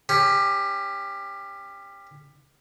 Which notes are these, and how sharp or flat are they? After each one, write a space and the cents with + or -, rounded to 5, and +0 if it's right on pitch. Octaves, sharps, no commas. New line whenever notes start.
C#4 +0 G4 +20